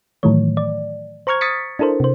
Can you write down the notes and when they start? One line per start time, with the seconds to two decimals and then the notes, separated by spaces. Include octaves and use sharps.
0.23 A2 D#3 E3 F#3 A3 C#5
0.57 D5
1.27 C5 A#5 C#6 F6 G#6
1.41 C#6 D#6 A6 B6 C#7
1.79 D4 E4 A4 A#4 C5
2.00 C3 C5